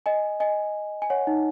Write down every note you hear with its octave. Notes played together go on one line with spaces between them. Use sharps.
D#5 G#5
D#5 G#5
G#5
C#5 F#5
D#4